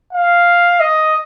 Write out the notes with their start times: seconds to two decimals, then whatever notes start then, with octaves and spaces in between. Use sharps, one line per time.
0.13 F5
0.80 D#5